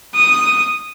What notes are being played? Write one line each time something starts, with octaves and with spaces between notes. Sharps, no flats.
D#6